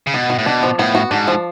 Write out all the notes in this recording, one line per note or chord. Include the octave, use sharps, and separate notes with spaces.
C#3
B2 B3
F#4
A2
B2 D4
F3
A2 B3
F#4
G#2 D4
F3